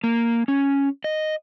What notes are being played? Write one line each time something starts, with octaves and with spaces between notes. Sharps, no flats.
A#3
C#4
D#5